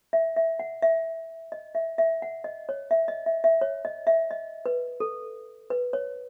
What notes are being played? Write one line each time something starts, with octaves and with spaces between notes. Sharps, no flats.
E5
E5
F#5
E5
D#5
E5
E5
F#5
D#5
C#5
E5
D#5
E5
E5
C#5
D#5
E5
D#5
B4
A4
B4
C#5